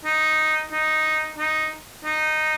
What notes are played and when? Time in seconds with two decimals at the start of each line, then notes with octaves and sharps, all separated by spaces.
0.05 D#4
0.72 D#4
1.38 D#4
2.05 D#4